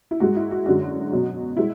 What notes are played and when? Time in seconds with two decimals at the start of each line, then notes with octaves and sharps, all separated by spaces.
0.11 E4
0.20 G#2 G#3 F#4
0.36 E4
0.51 F#4
0.66 F#2 D3 G#3 F#4
1.12 B2 F#3
1.57 G#3 E4